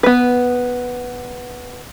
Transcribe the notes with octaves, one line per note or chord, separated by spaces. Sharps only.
B3 B4